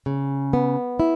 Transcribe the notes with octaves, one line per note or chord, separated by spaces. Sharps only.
C#3
B3
E4